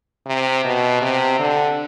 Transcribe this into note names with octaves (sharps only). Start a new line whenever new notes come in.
C3
B2
C3
D3